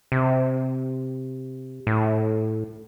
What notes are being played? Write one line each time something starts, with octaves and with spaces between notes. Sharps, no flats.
C3
A2